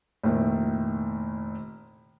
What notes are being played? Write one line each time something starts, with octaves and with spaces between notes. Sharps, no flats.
F1 A#2 D#3 E4